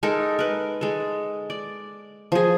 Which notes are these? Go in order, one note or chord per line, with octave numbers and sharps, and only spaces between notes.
G#3 D#4 A4 A#4
A#4 B4
G#3 A4
D5
F3 G#4